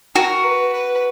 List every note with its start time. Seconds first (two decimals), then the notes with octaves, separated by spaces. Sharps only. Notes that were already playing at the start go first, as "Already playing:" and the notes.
0.15 F#4 A#4
0.44 B4
0.72 B4